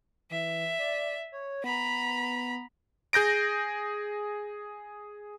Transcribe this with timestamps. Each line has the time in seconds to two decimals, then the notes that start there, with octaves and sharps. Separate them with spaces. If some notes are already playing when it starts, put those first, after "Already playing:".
0.30 E3 E5
0.79 D5
1.32 C#5
1.64 B3 A#5 B5
3.13 G#4 G6 A#6 D7